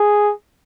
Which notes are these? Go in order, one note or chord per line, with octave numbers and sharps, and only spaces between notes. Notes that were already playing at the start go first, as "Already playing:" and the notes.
Already playing: G#4